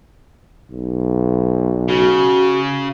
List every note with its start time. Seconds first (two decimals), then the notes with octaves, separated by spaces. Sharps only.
0.71 B1
1.89 C#3 F#4